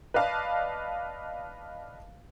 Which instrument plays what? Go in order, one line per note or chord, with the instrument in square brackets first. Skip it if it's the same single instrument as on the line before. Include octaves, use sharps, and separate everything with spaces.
[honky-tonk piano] B4 D5 D#5 F5 A5